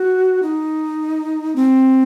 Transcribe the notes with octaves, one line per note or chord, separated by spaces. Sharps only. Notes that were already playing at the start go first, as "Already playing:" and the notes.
Already playing: F#4
D#4
C4